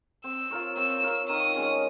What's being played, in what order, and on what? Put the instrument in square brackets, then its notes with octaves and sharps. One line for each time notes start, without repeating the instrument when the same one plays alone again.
[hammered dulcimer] C4 [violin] E6
[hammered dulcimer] F4 A#4 C#5
[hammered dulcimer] C4 [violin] E6
[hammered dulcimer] F4 A#4 C#5
[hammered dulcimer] D#3 [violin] D#6
[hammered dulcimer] G#3 C#4